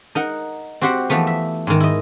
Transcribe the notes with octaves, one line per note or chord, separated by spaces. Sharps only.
D#4 A#4 F#5
C4 F#4 G4 C5 F#5
E3 F3 A3 B3
E5
G#2 D#3
E4 D#5